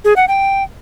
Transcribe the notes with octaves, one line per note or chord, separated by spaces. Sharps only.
G#4
F#5
G5